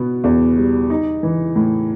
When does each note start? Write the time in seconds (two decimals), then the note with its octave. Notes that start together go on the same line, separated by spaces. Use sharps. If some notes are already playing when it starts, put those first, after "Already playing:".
Already playing: B2 B3
0.24 E2
0.57 G3
0.90 D#4
1.23 E3
1.56 A2